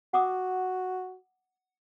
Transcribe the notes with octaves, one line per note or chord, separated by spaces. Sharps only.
F#4 F#5 D6 D#6